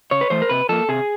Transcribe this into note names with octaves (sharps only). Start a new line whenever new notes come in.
C#3 C#5
B4
E3 A3 C5
A#4
C3 B4
F3 A#3 A4
C3 G#4